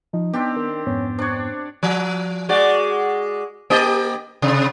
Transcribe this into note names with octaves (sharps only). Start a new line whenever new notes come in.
F3 D#4
B3 C4 D4 G4
D#3
F2 G#2 B3 C#4
C4 D4 C#5
F3
G#3 F#4 D5
A#3 G4 D#5
C3